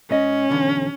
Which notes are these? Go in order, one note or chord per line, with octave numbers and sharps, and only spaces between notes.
G#2 C#4 D#5
B1 E2 D3